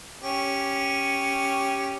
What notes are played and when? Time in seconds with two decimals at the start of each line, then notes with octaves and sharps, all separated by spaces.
0.22 C#4 G4